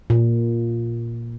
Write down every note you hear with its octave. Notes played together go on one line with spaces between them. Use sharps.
A#2